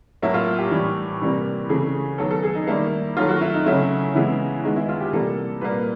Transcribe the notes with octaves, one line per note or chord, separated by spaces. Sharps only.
A2 F#3 A#3 E4
F4
G4
A2 E3 G3
C3 E3 G3 A#3
C#3 E3 A3 G#4
D#3 F#3 B3 A4
A4
G#4
D#4
D#3 G3 A#3 E4
D#3 F#3 A3 F4
F#4
E4
D#4
C#3 F#3 A3 E4
C#3 E3 G#3 B3 E4
D#3 G#3 B3 D#4
E4
F4
G4
C3 E3 G3 A#3 A4
A#2 G3 A#3 B4